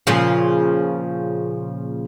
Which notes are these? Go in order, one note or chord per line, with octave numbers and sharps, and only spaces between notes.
A#2 C#3 F3